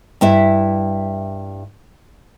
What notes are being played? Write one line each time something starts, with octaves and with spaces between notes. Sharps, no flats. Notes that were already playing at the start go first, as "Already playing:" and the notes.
G2 E4 E5